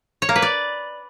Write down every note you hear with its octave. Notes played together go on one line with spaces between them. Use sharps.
C#5
A#3
B4
D5